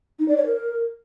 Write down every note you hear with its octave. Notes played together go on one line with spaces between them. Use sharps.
D#4
D5
C#5
A#4